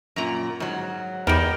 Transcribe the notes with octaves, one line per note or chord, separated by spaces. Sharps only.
F#2 A#2 A#5
G#2 F#3
E2 D#3 G3 A#4 G5